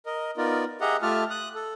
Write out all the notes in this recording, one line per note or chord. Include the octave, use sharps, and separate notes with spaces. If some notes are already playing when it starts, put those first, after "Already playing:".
A#4 D#5
B3 D#4 F4 A#4 D5
G4 G#4 D#5 E5 F#5 A#5
A3 F4 G4 E5 A5 F6
D#6 F#6
A4